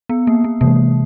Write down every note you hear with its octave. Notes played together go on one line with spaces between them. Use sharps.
B3
A#3
A#3
C3 E3 G#3 A#3